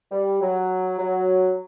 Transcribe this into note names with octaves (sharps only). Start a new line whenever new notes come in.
G3
F#3
F#3